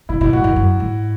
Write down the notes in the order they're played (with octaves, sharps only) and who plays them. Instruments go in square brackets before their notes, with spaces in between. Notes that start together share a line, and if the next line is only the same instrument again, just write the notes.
[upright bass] B2 [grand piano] E4
[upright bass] B2 [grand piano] E4
[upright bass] G#2 [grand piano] F#4
[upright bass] F#2 [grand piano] E4
[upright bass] F#2
G#2